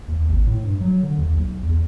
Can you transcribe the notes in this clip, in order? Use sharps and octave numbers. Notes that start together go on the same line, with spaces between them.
D#2
G#1
A2
G2
F#3
D3
D#2
B1
E2